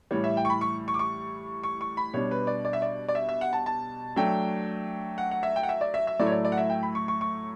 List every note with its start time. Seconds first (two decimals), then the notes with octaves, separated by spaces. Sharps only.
0.11 A2 E3 G3 C#5
0.24 E5
0.37 G5
0.45 C#6
0.50 B5
0.61 C#6
0.88 C#6
0.94 D6
0.99 C#6
1.63 C#6
1.81 C#6
1.97 B5
2.14 B2 G3 D4 C#5
2.31 B4
2.47 D5
2.65 D5
2.73 E5
2.82 D5
3.08 D5
3.15 E5
3.29 E5
3.41 F#5
3.53 A5
3.66 A5
4.16 F#3 A3 D4 G5
5.18 F#5
5.31 F#5
5.43 E5
5.56 G5
5.63 F#5
5.69 E5
5.81 D5
5.94 E5
6.07 E5
6.19 A2 F#3 A3 E4 D5
6.26 C#5
6.32 D5
6.45 D5
6.52 F#5
6.58 E5
6.70 G5
6.83 B5
6.95 C#6
7.08 C#6
7.21 C#6